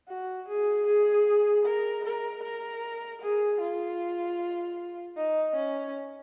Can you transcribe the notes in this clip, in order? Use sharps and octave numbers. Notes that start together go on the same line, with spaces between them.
F#4
G#4
G#4
A#4
A#4
A#4
G#4
F4
D#4
C#4